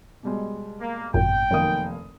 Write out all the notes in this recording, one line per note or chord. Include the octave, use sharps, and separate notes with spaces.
B2 G3 G#3
A#3
G#1 F#2 A#2 G5
F1 F#2 D#3 A#3 D#6